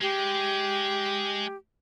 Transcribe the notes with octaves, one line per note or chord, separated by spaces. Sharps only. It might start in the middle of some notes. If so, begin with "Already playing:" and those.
G#3 G4